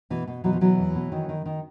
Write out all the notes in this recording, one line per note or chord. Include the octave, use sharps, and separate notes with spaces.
B2 E3
B2
B2 E3 F#3
F3
B2 E3 F#3
E2
B2
D#3
D#3
D#3